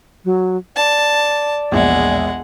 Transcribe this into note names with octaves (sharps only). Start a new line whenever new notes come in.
F#3
D5 A5
E1 A#1 G#3 F#5